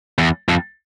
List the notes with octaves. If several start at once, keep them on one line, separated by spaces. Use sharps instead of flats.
E2
F2